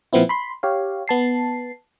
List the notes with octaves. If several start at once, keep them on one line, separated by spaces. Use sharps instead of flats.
A#2 F3 B3 C4 E4
B5 C6
G4 C#5 F5
B3 A5 C7